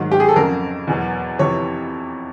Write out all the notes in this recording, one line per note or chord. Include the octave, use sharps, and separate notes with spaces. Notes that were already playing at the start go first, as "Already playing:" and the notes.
Already playing: G#2 D#3 F#3
G4
G#4
A4
F2 C#3 F#3 A#4
E2 B2 F#3
F2 C3 E3 C#5